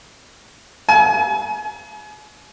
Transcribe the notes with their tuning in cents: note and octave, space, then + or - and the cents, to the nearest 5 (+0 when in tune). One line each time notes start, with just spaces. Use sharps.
G#5 +35